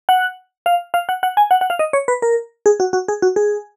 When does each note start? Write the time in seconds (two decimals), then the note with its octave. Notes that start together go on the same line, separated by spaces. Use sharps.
0.09 F#5
0.66 F5
0.94 F5
1.09 F#5
1.23 F#5
1.37 G#5
1.51 F#5
1.61 F#5
1.70 F5
1.79 D#5
1.93 C#5
2.08 B4
2.22 A#4
2.66 G#4
2.80 F#4
2.93 F#4
3.08 G#4
3.22 F#4
3.36 G#4